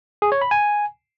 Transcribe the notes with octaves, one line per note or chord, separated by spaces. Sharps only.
G#4
C#5
B5
G#5